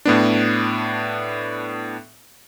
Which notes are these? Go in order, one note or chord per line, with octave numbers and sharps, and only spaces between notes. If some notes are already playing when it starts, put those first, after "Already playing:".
A2 B3 D4